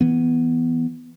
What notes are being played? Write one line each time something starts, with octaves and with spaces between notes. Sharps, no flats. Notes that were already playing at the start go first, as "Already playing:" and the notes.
E3 B3